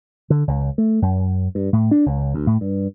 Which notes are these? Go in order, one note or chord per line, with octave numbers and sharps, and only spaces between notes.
D3
C#2
A3
F#2
G2
A2
D4
C#2
D2
A2
G2